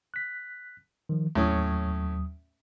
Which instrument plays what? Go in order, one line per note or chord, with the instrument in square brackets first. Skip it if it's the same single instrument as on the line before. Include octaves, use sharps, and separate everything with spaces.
[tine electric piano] F#6 B6
D#3 F3
[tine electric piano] D#2 F#3 D#6 [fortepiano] A2 C#4